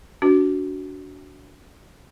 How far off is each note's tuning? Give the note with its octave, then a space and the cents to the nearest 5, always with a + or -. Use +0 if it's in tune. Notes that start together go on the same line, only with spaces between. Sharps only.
D4 -25 F#4 +0